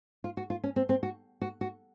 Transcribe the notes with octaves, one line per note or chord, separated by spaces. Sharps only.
F4
F#4
F4
C#4
C4
C4
F#4
F#4
F#4